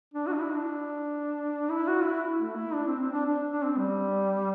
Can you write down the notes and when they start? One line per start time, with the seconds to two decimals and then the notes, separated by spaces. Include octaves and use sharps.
0.14 D4
0.27 F#4
0.33 D4
0.40 E4
0.53 D4
1.70 E4
1.88 F#4
2.04 E4
2.39 A3
2.57 E4
2.74 D4
2.87 C4
3.00 C4
3.13 D4
3.26 D4
3.52 D4
3.65 C4
3.78 G3